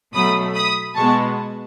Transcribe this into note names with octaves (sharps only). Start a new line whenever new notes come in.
B2 F#3 A3 B5 D#6
B5 D#6
B2 G#3 B3 A5 C#6